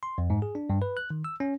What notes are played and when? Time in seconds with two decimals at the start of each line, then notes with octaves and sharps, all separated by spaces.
0.03 C6
0.18 F2
0.30 G#2
0.42 G#4
0.55 D4
0.70 G2
0.82 B4
0.97 F#6
1.10 D#3
1.24 E6
1.40 C#4